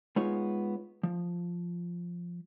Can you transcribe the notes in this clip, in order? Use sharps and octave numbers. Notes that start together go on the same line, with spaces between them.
G#3 B3 D#4 F4 C#5
F3